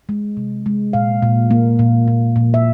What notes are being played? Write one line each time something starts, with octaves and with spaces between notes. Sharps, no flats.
G#3
C3
G#3
A#2 F5
A#2
A#3
A#2
A#2
A#2
E5